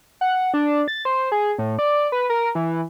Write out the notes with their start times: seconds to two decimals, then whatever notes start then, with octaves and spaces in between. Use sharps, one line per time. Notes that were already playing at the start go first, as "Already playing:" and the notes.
0.21 F#5
0.54 D4
0.88 A6
1.05 C5
1.32 G#4
1.59 A2
1.79 D5
2.12 B4
2.30 A#4
2.55 E3